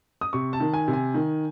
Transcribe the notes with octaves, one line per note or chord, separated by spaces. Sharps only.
D#6
C3 C#6
A5
D#3
G#5
C3
G#5
D#3